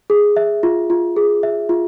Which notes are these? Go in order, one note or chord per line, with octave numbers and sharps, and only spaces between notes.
G#4
E5
F4
F4
G#4
E5
F4